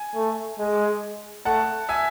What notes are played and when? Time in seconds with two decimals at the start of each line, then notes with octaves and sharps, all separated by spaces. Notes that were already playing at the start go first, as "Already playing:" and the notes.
Already playing: G#5
0.16 A3
0.59 G#3
1.45 A3 F#5 A5
1.89 E5 G#5